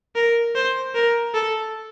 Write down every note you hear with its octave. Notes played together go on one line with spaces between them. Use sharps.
A#4
C5
A#4
A4